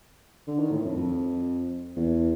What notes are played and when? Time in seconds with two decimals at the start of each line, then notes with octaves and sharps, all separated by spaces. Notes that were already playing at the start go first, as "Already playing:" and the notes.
0.47 D3
0.59 D#3
0.72 A2
0.85 F2
0.97 F2
1.96 E2